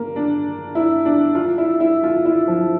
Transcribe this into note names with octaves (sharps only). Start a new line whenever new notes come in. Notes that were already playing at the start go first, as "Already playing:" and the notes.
Already playing: A#3
D4
E4
D4
F4
E4
E4
F4
E4
F3